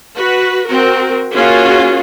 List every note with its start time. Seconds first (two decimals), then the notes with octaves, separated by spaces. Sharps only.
0.16 F#4 B4
0.67 C4 F#4 A#4
1.34 A#3 C#4 F4 F#4 G#4